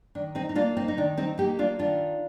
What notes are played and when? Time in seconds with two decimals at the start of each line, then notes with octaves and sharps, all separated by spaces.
0.15 D#3 D4
0.35 C4 D#4
0.49 D#4
0.55 A#3 D4 F4
0.77 C4 D#4
0.88 D#4
0.97 D#3 D4
1.17 C4 D#4
1.38 A#3 D#4 G4
1.59 D4 F4
1.79 D#3 D4 F4